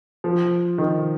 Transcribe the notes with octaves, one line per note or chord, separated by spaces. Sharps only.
F3
D#3